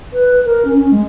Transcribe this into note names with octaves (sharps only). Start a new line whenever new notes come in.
B4
A#4
C#4
C#4
G#3